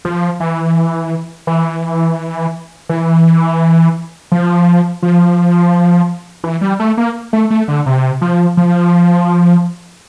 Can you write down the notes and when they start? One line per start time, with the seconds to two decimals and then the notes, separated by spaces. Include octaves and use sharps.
0.05 F3
0.40 E3
1.47 E3
2.89 E3
4.32 F3
5.02 F3
6.44 E3
6.61 G3
6.79 A3
6.97 A#3
7.33 A3
7.50 A3
7.68 D3
7.86 C3
8.21 F3
8.57 F3